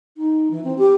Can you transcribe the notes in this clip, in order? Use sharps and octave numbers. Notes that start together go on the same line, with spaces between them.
D#4
E3
C4
G4